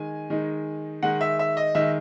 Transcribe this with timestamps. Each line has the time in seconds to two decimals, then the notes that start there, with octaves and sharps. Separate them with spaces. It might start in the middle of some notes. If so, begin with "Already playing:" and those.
Already playing: D#3 G#3 G#5
0.30 D#3 G#3 D#4
1.03 D#3 G#3 D#4 F#5
1.21 E5
1.39 E5
1.57 D#5
1.75 D#3 G#3 D#4 E5